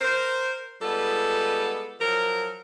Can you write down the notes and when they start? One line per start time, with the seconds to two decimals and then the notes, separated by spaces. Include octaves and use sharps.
0.01 A#4 C5
0.81 G3 G#3 B3 F4 A4
2.00 F3 F#3 A#4